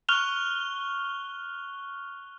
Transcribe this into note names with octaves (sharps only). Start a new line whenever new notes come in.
C#6 F6 F#6 F7 G7